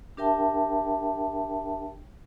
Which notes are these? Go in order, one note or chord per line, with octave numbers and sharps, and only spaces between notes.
D4 G4 A#4 E5 G5 A5